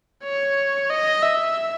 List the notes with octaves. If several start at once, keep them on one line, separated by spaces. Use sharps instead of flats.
C#5
D#5
E5